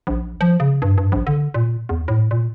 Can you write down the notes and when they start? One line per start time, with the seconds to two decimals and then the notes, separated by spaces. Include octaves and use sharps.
0.07 A#1
0.41 F3
0.60 C#3
0.82 G2
0.98 G2
1.12 A#1
1.27 D3
1.54 A#2
1.89 E2
2.08 A2
2.31 A#2